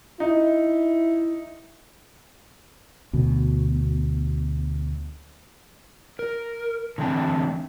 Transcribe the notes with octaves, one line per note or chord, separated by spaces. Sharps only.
D#4 E4
D2 B2
A#4
D3 E3 A3 C4 A5